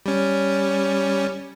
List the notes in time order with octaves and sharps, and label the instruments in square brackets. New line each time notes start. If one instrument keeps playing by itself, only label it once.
[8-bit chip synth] G3 C#4